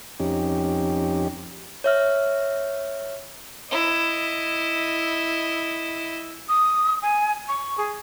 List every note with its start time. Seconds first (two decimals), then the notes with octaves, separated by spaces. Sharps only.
0.20 F2 C#4 D#4 G4
1.84 C#5 E5 F6
3.71 E4 D#5
6.49 D#6
7.02 G#5
7.48 C#6
7.78 G#4